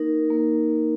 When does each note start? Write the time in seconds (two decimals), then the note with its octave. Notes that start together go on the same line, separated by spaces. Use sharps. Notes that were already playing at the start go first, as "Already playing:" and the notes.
Already playing: A#3 D#4 A#4
0.30 A#3